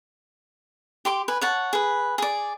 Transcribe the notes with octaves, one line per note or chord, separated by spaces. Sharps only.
G4 C6 D6
B4 G#5
C#5 F#5 A5
G#4 B4
G#4 D5